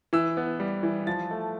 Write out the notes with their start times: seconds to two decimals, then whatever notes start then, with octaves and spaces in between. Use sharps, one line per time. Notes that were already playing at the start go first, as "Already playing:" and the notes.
0.13 E3 E6
0.37 B3
0.60 G3
0.83 E3
1.07 F3 A6
1.31 A3